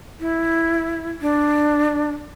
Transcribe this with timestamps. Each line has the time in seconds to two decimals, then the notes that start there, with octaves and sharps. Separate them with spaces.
0.20 E4
1.21 D4